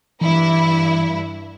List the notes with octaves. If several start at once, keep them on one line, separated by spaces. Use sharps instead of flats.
G2 E3 E4